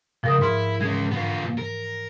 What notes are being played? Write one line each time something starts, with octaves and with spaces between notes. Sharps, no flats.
C#2 F3 A#4 D#6
G#2 E4 F6
E3 G#3 C#4 G#6
B3 F4
A#4